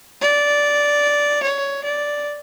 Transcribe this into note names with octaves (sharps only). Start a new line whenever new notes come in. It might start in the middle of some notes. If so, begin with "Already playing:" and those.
D5
C#5
D5